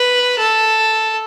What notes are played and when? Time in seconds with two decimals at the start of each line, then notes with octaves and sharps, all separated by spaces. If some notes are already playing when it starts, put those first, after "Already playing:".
Already playing: B4
0.39 A4